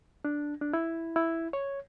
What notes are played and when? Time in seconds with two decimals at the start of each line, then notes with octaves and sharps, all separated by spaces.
0.25 D4
0.61 D4
0.73 E4
1.16 E4
1.53 C#5